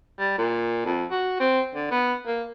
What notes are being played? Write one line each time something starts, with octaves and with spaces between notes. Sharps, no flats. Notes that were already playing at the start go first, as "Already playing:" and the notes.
G3
A#2
F2
F#4
C4
D3
B3
A#3